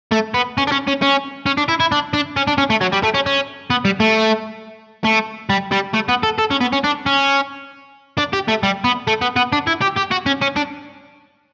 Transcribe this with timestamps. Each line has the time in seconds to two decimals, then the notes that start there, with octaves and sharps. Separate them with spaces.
0.12 A3
0.34 B3
0.58 C#4
0.67 D4
0.72 C#4
0.87 C#4
1.02 C#4
1.46 C#4
1.57 D4
1.68 E4
1.80 E4
1.92 D4
2.14 D4
2.37 C#4
2.48 D4
2.58 C#4
2.70 A3
2.81 F#3
2.92 G3
3.03 A3
3.14 C#4
3.26 C#4
3.70 B3
3.85 G3
4.00 A3
5.05 A3
5.50 G3
5.72 G3
5.94 A3
6.09 B3
6.23 A4
6.38 A4
6.51 C#4
6.61 B3
6.72 C#4
6.84 D4
7.06 C#4
8.18 D4
8.33 G4
8.48 A3
8.63 G3
8.84 B3
9.08 A3
9.22 B3
9.36 B3
9.53 D4
9.67 E4
9.81 G4
9.96 G4
10.11 F#4
10.26 C#4
10.42 C#4
10.56 D4